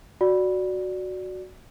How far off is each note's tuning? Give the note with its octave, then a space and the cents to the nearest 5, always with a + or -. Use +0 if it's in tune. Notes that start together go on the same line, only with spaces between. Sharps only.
F#4 +0 D5 +0